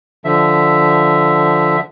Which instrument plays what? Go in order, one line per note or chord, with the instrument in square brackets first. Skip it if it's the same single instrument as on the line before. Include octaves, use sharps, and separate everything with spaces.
[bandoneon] D3 F3 E5